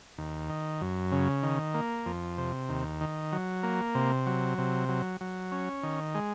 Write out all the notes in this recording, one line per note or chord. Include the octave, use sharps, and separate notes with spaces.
D#2
D#3
F#2
C#3
D#3
A#3
F2
C3
D#2
D#3
F#3
A#3
C3
F#3
C3
F#3
F#3
C#4
D#3
G#3